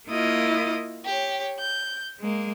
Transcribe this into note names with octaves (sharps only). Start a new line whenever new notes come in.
A#3 E4 F4 D#5 D#6
G4 C#5
G6
G#3 A#3